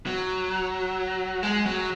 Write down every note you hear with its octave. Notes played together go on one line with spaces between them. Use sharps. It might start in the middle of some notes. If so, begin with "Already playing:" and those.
F#3
G#3
F#3